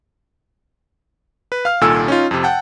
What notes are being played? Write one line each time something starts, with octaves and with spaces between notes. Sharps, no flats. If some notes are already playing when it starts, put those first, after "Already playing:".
B4
F5 F6
C2 A#2 D#3 A4 G#5 E6
C#4 D#4 F4
F2 C3
F#5 G5 A5